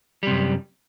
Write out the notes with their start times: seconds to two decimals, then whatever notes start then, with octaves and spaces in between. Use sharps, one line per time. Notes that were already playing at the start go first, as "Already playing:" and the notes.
0.23 G3
0.27 C3
0.31 F#2